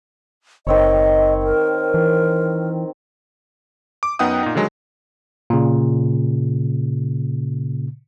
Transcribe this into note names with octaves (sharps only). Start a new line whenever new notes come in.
F#1 D#3 C4 C#5 D#5
A#4
E3
D6
F#2 B3 D#4 F#5 G5 D#6
A#2 D#4
D3 D#3 F#3 G#3
A#2 C#3